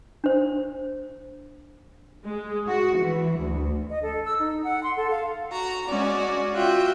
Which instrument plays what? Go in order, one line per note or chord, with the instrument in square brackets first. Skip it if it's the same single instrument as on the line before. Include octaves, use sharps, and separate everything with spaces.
[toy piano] D4 C5
[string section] G#3
F#4
E3
D2
[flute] D#5
A4
E6
D#4
F#5
C6
A4
F5
[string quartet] F#4 A#5
G#3 C#4 F#4 D5
F4 F#4 E5 G5